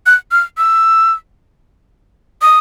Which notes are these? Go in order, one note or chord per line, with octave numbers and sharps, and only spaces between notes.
F#6
F6
E6
D#6